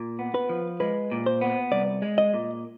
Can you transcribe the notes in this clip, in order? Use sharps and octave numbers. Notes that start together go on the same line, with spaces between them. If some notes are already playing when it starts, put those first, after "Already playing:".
Already playing: A#2
B3
B4
F3
G#3 B4
A#2
C5
B3
C2 D5
G#3
D#5
A#2